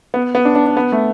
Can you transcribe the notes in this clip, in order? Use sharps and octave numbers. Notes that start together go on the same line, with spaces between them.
B3
B3
D4
D4
D4
B3
A3